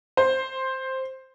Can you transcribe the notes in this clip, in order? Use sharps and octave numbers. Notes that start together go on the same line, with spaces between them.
C5